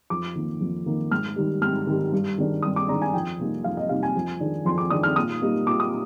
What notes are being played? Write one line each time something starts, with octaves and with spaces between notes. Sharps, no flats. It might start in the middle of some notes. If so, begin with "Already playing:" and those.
F2 D6
D#3 A#3
F2
D#3 A#3
G#2 F6
D#3 G3
G#2 F6
D#3 G3
G2
D#3 G#3 D4
G2 D#6
D6
D#3 G#3 D4 A#5
G#5
F2 G5
C3 G3 A#3 D#4
F2 F5
D#5
C3 G3 A#3 D#4 F5
G#5
F2
D#3 G#3 D4
F2 C6
D6
D#3 G#3 D4 D#6
F6
A#2 D#6
G3 A#3 D#4
A#2 D6
D#6